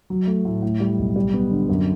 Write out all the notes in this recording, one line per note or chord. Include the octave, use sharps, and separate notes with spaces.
F#3
A3
A2
A2
G3
B1
G3
B3
D3
F#2